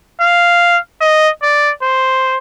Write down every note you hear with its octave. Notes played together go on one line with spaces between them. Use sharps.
F5
D#5
D5
C5